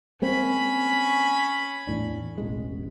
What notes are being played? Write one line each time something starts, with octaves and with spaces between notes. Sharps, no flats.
G#3 A#3 C4 C#4 B5
E2 A2 D4
E1 A1 G#3